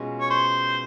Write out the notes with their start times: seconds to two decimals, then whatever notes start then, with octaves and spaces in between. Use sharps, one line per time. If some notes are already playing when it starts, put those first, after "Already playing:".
Already playing: B2 G#3 C#4 F4
0.20 C#5
0.30 C5